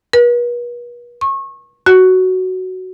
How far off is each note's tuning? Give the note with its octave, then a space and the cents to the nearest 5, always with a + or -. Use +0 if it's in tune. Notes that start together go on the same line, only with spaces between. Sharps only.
B4 -45
C#6 -30
F#4 +5